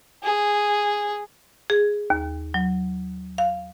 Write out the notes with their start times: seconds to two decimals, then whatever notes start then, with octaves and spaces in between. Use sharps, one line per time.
0.23 G#4
1.70 G#4
2.10 D#2
2.54 F#3
3.38 F5